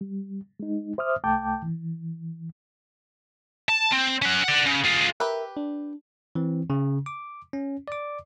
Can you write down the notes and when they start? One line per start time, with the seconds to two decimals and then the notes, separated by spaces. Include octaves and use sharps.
0.01 G3
0.60 G#3 D#4
0.98 C5 E5 D6 D#6 F6
1.24 C2 A3 G5 A5 D6 G6
1.62 E3
3.69 A5
3.92 C4
4.22 C#4 F#5
4.44 D5 F#5
4.66 C#3
4.84 F4 G#4
5.20 G4 A#4 B4 E5
5.57 D4
6.35 E3 C4
6.70 C#3
7.06 D6
7.53 C#4
7.88 D5 D6